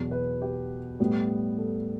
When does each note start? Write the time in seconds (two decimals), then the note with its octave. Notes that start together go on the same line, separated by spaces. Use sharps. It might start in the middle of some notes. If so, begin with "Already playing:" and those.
Already playing: E2 B2 F#3 B3
0.11 B4
0.42 G4
0.99 A2 G3 B3
1.58 A4